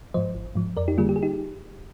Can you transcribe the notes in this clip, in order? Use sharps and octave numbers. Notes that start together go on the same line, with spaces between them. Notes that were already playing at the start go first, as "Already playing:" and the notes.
G#2 F3 C5 D#5
G#1
G#2 F3
F2 A#4 D5
D#4 G4
D3 G3 A#3 F4 G#4
G4
G#4
D#4 G4